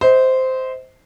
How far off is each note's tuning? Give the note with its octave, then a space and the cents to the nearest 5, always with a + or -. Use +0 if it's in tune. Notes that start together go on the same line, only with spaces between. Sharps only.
C5 -10 D#5 +40